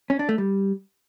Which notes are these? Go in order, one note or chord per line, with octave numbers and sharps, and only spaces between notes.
C#4
D4
A3
G3